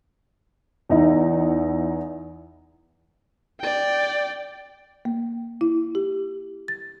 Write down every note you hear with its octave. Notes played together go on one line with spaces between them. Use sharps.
E2 D#4 E4
D5 G5
A#3
E4
G4
A6